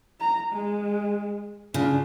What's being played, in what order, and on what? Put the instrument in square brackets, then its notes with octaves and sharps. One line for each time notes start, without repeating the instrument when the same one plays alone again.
[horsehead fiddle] A#5
G#3
[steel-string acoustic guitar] C#3 [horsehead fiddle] D4 F4